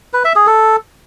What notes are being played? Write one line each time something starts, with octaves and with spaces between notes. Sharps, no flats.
B4
E5
G#4
A4